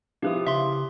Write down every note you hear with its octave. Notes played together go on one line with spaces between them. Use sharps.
F3 E4 F4 G4 B4 D#6
C#3 E5 C6